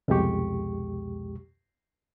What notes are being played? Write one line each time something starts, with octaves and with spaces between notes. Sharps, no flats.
C2 F2 B2 G#3 G4 C#6